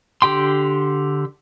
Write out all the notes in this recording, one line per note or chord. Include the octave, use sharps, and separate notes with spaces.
D3 G4 G5 C6